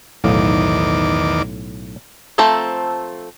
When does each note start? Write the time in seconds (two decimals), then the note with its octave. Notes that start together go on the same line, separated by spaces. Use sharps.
0.24 B1 E2 A2 D#3 F5 D6
2.38 F3 A3 C4 A4 A#5